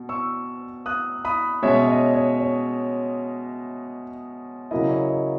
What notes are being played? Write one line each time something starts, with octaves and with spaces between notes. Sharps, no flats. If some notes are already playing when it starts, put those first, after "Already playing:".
Already playing: B2
C#6 E6
D#6 F#6
B5 D#6
B2 G#3 C#4 C#5 E5
D#5
C#5
C#5
C#3 F#3 A#3 E4 D#5
C#5
D#5